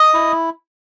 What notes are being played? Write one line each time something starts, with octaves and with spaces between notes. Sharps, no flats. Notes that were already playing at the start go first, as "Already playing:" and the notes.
Already playing: D#5 D#6
E4